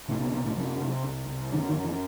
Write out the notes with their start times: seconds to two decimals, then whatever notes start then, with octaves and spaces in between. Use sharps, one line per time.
0.08 C2 A2 A3
0.20 B2 B3
0.32 C2 B2 B3
0.44 A2 A3
0.56 F#2 C3 F#3
0.80 C3
1.04 C2
1.28 C2
1.52 F#2 D#3
1.69 D#3
1.76 F#2
1.85 E3